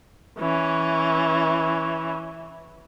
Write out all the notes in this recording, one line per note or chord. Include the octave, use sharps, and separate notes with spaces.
E3 C#4